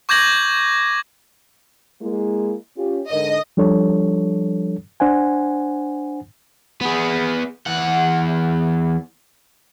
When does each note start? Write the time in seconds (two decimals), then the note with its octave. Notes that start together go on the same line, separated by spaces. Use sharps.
0.09 C#6 D6 G6 G#6 A#6 F#7
2.02 G#3 A#3 E4
2.77 C#4 F4 G4
3.11 G#2 D3 A#4 D#5
3.57 F3 G3 D4 A4 C#5
5.00 D4 C5 F#5 G#5
6.81 B3 G#4
7.66 E2 F#5